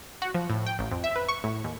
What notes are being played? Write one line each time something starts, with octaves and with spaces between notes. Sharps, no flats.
F#4
F3
A2
G5
A1
F2
E5
B4
C#6
A2
D#2